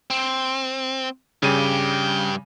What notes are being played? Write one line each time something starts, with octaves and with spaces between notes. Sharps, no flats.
C4
G2 C#3 G3 G4 D#7